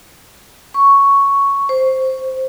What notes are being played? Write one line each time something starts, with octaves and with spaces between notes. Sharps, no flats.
C#6
C5